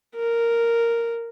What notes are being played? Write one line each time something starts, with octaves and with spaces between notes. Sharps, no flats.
A#4